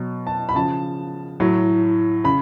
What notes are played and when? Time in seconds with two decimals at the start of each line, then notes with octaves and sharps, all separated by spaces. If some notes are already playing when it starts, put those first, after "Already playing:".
Already playing: B2 F#3
0.27 A5
0.49 B5
0.55 C#3 F3 A5
1.40 A2 F#3
2.24 C#3 B5